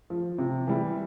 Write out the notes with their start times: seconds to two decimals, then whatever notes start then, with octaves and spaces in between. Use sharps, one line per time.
0.10 F3
0.38 C3
0.67 E3 G3